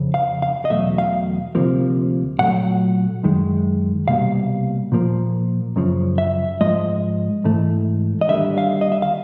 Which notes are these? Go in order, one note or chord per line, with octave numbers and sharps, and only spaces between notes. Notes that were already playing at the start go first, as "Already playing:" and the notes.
Already playing: F2 C#3
F5
F5
D#5
E2 B2 F#3 A3 E5
F5
D2 C3 F3 A#3
A#2 F#3 A3 F#5
F#2 D#3 G#3
C2 B2 G3 A#3 F5
A#2 F3 A#3
F#2 C#3 F3
E5
G#2 F3 G#3 D#5
G#2 E3 A3
D#5
D#2 D3 G3 A#3 E5
F5
D#5
E5
F5